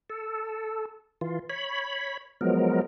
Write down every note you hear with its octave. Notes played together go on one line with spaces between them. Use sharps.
A4
E3 F4
C#5 B5
F3 F#3 G#3 B3 A#4